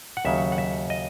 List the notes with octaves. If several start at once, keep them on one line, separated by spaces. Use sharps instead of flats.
F#5
D#2 C#3 F#3 E5
F#5
E5
D#5